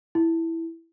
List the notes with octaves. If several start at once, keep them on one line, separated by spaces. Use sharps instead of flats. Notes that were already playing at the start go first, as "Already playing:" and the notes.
E4